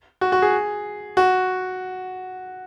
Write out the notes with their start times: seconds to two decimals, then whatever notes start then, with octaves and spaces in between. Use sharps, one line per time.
0.21 F#4
0.32 F#4
0.42 G#4
1.17 F#4